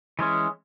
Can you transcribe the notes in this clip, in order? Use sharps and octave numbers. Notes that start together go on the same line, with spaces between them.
E3 G#3 C#4